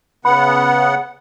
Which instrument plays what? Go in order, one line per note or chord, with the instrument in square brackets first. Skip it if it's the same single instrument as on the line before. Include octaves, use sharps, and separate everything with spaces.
[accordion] C#3 B3 F#5 [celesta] B5